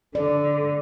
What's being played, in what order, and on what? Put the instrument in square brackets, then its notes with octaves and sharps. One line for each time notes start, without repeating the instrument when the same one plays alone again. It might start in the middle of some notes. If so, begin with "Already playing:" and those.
[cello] D3 [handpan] D5